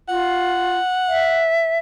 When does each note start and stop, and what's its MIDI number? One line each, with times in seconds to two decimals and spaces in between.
0.09 0.79 65
0.09 1.48 78
1.08 1.79 76